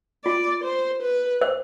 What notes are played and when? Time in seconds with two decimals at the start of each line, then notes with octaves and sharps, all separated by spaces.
0.25 F4 D5
0.64 C5
1.02 B4
1.41 C5